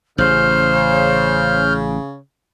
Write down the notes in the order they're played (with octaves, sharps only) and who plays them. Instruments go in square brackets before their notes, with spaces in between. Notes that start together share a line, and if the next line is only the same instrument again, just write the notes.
[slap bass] A1 [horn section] C#3 [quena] C5 [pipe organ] F6 G6